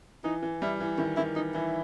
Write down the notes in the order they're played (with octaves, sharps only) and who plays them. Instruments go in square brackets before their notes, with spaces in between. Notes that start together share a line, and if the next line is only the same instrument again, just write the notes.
[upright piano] E3 [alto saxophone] D#4
[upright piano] E3
[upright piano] G3 [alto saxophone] E4
[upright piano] E3
[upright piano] D#3 [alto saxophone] E4
[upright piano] D#3 [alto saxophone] E4
[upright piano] E3 [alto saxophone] D#4
[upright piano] E3 [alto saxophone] E4